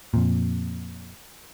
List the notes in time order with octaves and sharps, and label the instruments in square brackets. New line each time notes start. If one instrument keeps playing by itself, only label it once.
[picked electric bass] F2 A#2